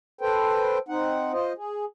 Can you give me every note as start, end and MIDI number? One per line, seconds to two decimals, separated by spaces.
0.21 0.78 69
0.21 0.78 71
0.21 0.78 72
0.21 0.78 79
0.89 1.32 60
0.89 1.32 63
0.89 1.32 78
1.33 1.53 65
1.33 1.53 72
1.33 1.53 75
1.57 1.85 68